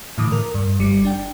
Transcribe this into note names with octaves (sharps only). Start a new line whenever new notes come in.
A2 D3 E3 D6 D#6
A#4
G2
G1 G3 C#7
D4 G5